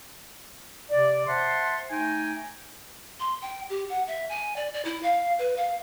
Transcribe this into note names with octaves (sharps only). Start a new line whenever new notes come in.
C3 D5
C5 E5 F#5 A5 C6
A3 D#4 G5 G#5
C6
G5
G4
F#5
E5
G#5
D5
D5
E4
F5
B4
F5